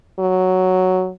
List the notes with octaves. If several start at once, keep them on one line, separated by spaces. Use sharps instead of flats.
F#3